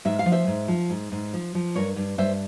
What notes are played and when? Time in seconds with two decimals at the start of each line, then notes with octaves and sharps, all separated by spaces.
0.05 G#2 E5
0.19 F5
0.26 F3
0.32 C5 E5
0.47 G#2
0.68 F3
0.90 G#2
1.12 G#2
1.33 F3
1.55 F3
1.75 G2 A#4 C#5
1.96 G2
2.18 G2 C5 E5